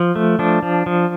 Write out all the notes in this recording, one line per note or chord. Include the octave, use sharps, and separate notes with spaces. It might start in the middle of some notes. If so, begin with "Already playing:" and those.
Already playing: F3
A3
F3 D4
F3
F3